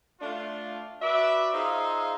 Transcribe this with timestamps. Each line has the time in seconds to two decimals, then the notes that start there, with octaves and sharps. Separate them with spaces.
0.21 A3 D4 F4
1.02 F#4 B4 D5 E5
1.54 D#4 F4 G#4 C5 E5 F5